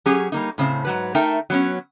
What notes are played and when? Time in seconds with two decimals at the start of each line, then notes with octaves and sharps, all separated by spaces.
0.06 F#3 C#4 G4 G#4
0.32 G3 A#3 D#4
0.58 A2 C#3 C4 D5 A5
0.85 G#2 F#3 B4
1.15 A3 D#4 A#4 E5 G5 A5
1.50 F#3 B3 C#4